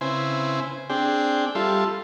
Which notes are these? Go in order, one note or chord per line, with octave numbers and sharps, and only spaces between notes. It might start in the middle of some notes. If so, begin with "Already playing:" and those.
C#3 C4 E4 B4 C5 G#5
C4 D4 G#4 G5
G3 F4 A4 E5 C6